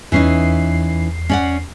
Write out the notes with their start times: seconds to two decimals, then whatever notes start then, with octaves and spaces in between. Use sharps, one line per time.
0.12 E2 E3 C#4 D#4 C7
1.29 C#4 D5 F#5